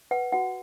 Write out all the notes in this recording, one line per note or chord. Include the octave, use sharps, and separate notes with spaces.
B4 F#5
F#4 F#5